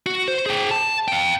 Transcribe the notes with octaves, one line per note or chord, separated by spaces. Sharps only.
F#4
C5
G#4 G5
A5
F5 G5